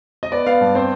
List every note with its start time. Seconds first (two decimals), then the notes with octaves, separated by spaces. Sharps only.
0.23 D#5
0.32 B3 D5
0.46 B3 F5
0.61 G2
0.75 C4 C5